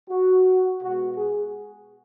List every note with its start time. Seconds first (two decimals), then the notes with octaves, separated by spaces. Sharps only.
0.09 F#4
0.82 B2 G#3 F#4
1.17 G#4